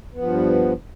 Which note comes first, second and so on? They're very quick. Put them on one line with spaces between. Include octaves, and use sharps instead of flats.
B3 F3 G2